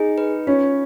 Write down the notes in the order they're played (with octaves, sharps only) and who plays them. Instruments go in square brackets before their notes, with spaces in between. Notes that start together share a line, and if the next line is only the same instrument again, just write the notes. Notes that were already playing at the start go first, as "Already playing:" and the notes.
Already playing: [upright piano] D#4 [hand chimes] G#4
[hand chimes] B4
[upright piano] C#4 [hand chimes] F4